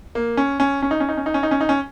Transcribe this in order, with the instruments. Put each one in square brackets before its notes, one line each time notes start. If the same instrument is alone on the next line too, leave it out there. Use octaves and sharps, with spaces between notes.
[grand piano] A#3
C#4
C#4
C#4
D#4
C#4
D#4
C#4
D#4
C#4
D#4
C#4
D#4
C#4